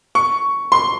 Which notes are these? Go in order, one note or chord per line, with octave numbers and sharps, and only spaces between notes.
C#6
C6